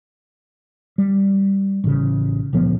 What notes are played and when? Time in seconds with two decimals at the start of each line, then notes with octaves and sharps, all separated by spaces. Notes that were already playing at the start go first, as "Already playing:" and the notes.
0.98 G3
1.84 A1 C#3
2.53 C#2 A#2 F3 B3